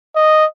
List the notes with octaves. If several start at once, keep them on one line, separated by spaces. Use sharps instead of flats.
D#5